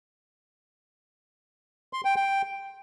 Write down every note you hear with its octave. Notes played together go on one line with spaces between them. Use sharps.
C6
G5
G5